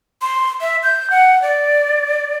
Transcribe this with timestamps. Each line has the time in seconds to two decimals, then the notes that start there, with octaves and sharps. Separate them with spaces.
0.22 C6
0.61 E5
0.83 G6
1.10 F#5
1.42 D5